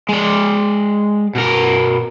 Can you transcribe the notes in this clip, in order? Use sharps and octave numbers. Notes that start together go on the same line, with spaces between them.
G#3 D5
B2 A#4